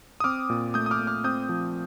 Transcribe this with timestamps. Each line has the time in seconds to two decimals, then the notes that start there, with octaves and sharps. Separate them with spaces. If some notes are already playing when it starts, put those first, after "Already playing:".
0.20 D#6
0.24 C4 D6 F6
0.50 A#2
0.74 A3 D#6 G6
0.86 D#6
0.91 D6 F6
0.99 A#2
1.07 D6 F6
1.24 C4 D#6 G6
1.49 F3